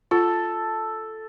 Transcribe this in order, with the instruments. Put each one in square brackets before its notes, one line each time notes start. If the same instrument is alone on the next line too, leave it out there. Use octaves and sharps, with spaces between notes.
[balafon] F4 [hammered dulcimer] A4